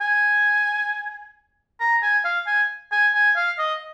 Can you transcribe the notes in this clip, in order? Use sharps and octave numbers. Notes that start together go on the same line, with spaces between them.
G#5
A#5
G#5
F5
G#5
G#5
G#5
F5
D#5